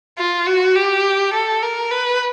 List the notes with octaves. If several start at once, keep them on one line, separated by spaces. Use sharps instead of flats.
F4
F#4
G4
A4
A#4
B4